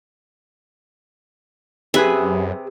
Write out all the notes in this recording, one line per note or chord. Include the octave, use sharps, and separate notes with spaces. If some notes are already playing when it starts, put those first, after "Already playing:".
F#2 C3 G#4 B4 E5